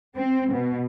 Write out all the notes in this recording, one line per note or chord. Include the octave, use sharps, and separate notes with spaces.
C4
B2